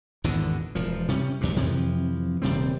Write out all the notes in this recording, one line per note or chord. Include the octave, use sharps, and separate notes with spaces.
G#1 E2 B2 D3
E1 F3
C3 G3 C#4
E2 G2
F2 C3 E3 F3
D#1 C3 G3 C4